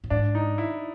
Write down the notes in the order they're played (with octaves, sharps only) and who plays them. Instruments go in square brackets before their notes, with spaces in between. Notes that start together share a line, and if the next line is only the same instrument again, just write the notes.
[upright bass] A2
[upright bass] G#2 [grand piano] D4
[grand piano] D#4
E4